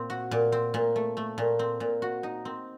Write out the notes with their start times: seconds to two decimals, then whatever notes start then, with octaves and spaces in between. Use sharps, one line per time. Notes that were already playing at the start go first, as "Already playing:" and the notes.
Already playing: A#2 C4
0.10 F#4
0.31 A#2
0.52 C4
0.74 A#2
0.96 A3
1.17 A3
1.38 A#2
1.59 C4
1.80 A#2
2.02 F#4
2.23 D#4
2.45 C4